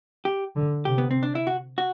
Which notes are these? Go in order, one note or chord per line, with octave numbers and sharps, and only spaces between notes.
G4
D3
C3 G4
B3
C4
D4
E4
F#4
F#4